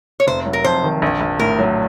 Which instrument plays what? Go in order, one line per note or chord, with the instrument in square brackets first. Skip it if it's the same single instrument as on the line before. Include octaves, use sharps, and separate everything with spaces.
[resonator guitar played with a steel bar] C#5
[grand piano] F1 [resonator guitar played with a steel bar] C5
[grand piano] F#3
[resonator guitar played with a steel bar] A#4
[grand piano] F2 [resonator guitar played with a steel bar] C5
[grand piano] D#3
A#1
A#1
[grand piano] A2 [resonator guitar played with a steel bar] A#4
[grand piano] F#3